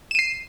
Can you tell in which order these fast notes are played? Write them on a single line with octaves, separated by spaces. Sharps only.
E7 D#7 C7